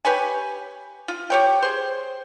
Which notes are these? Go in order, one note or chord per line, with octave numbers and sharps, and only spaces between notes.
G4 B4 C#5 G#5
F4
G4 C#5 G5
G#4 C5